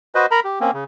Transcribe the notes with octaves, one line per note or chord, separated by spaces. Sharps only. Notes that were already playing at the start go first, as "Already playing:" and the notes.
F#4 B4 C5 D#5
A#4 A#5 B5
G4
A#3 C4 C#4
C#3